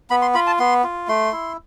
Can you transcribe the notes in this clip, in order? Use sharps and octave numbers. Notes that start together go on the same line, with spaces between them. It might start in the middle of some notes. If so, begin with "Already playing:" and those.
B3 B5
C6
F4 B5
A5
B3 C6
F4
A3 C6
E4